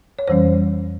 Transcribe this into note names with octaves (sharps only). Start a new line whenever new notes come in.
C#5
F2 E3 G3 C#4 C5